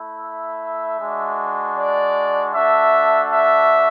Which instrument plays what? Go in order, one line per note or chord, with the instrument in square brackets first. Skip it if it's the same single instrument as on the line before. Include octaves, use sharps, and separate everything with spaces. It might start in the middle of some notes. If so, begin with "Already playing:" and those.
Already playing: [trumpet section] A3 E4
E5
G#3 D4 F#4
D5
A3 D4 F#4 E5
E5